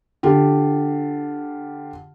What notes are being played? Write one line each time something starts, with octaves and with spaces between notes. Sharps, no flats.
D3 F4 G4